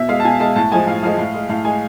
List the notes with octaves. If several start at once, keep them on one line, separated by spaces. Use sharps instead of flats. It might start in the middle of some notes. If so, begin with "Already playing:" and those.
Already playing: B2 E5
G#3 F5
A5
B2 G#5
G#3 A5
A2 A5
F3 G#3 G#5
A2 F5
F3 G#3 F5
A2
G#3
A2 F5
G#3 G#5